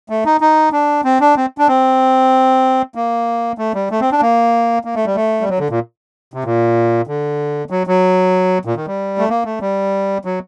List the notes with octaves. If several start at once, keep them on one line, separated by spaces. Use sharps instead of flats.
A3
D#4
D#4
D4
C4
D4
C4
D4
C4
A#3
A3
G3
A3
C4
D4
A#3
A#3
A3
G3
A3
G3
F#3
D3
A#2
C3
A#2
D3
F#3
F#3
A#2
D#3
G3
A3
A#3
A3
G3
F#3